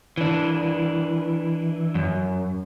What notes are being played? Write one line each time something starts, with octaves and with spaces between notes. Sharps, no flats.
E3 D4
F#2